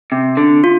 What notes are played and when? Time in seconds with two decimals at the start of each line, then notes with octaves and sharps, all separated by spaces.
0.12 C3
0.37 D3
0.64 F4